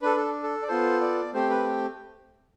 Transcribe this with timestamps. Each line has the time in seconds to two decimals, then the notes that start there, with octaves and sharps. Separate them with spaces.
0.02 D4 A4 B4
0.17 A4
0.43 A4
0.62 D5
0.68 B3 F4 A4 C5
1.01 D5
1.34 A3 C4 G4 C5
1.50 B4